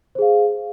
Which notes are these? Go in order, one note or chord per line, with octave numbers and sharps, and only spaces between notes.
G#4 C5 F5